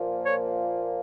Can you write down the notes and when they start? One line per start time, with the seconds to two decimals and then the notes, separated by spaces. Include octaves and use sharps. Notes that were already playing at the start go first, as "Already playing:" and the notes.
Already playing: A#2 F3 A#3
0.23 C#5